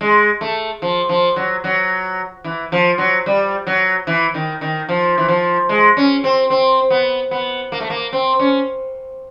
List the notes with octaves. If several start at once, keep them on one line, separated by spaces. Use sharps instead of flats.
G#3
A3
F3
F3
F#3
F#3
E3
F3
F#3
G3
F#3
E3
D#3
D#3
F3
E3
F3
G#3
C#4
C4
C4
B3
B3
A#3
A3
A#3
C4
C#4